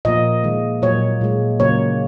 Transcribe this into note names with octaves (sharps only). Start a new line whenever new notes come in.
A#2 F3 A#3 D#5
D#3 G#3
A#2 F#3 A#3 C#5
A#2 G#3
C#3 F#3 A#3 C#5